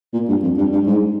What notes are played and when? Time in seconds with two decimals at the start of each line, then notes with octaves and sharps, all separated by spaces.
0.13 A#2
0.29 G2
0.43 F2
0.58 G2
0.72 G2
0.86 G#2